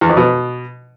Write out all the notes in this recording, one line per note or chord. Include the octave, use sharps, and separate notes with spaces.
E2
F2
B2